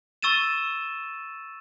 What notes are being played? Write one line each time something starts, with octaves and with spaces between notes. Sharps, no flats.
C#6 E6 A6 D#7 E7